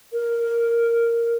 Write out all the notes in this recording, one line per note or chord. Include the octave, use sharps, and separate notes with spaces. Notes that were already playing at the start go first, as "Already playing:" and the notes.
A#4